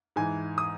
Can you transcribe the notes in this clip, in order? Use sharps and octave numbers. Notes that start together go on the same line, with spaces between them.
G#2 E3 G#5
D#6